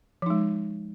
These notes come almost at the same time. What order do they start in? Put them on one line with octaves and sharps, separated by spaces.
F3 D#4 G#3